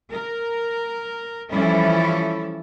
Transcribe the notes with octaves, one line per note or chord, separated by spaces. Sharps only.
A#4
E3 F3 G3 C#4 E4 A4